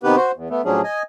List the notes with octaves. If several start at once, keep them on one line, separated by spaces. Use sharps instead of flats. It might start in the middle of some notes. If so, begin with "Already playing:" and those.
C3 D#3 B3 G4 B4
F#4 C5
E2
A3 B3
A2 F3 F#3 C#4 D4 G#4
D#5 G#5